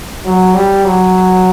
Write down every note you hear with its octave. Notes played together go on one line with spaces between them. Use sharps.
F#3
G3
F#3